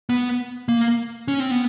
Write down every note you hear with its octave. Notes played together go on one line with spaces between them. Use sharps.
B3
A#3
C#4
C4
B3